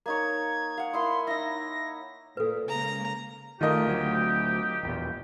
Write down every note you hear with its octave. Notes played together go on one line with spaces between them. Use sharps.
A#3 D#4 C#5 G#6
F5 F#5
A#3 E4 D#5 C6
D#4 E4 A#6
A#2 A4 B4
C#3 G#3 A#3 A#5
D#3 A3 F4 G4 A#4 D#5
D2 F#3
E1 A#1 E2